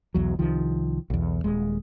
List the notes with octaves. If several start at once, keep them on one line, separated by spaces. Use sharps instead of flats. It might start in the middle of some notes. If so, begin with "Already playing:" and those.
B1 E2 F#3
C2 D#3 F3
B1 E2
D#1 G#3